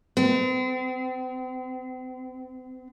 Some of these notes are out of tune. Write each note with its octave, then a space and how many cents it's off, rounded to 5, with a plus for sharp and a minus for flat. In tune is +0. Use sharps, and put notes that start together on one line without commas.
C4 -40